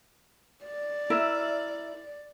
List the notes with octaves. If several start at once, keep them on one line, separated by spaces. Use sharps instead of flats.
D5
E4 A#4 E5